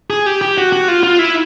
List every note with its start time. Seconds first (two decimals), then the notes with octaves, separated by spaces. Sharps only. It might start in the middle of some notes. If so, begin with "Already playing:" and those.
0.10 G#4
0.26 G4
0.42 G4
0.58 F#4
0.73 F#4
0.88 F4
1.03 F4
1.19 E4